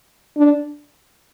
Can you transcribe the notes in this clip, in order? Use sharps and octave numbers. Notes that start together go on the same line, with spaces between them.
D4